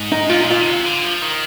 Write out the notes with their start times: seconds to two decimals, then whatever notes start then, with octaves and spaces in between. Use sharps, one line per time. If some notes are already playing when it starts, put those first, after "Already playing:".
Already playing: G#2
0.12 D#4
0.30 A#2 F4
0.40 D#4
0.48 A#2 F4
0.61 D3
0.67 C3
0.85 D3
1.03 F3
1.22 D#3